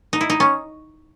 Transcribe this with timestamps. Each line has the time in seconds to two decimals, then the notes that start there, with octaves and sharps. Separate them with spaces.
0.13 D#4
0.21 E4
0.30 D#4
0.40 C#4